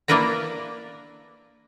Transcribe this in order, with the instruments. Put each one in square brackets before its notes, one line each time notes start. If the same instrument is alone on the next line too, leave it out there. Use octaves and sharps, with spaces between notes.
[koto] A#3 D4 E4 A#4 B4 A#5